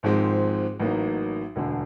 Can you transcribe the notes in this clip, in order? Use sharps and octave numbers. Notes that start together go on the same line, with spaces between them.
G#1 G#2 F3 G#3 C4
A1 A2 F#3 A#3 D#4
E1 D2 D3